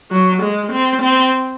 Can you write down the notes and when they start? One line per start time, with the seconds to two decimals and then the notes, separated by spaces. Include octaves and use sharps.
0.11 F#3
0.42 G#3
0.72 C4
1.02 C4